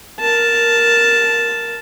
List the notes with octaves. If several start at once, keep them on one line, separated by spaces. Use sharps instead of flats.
A#4 A5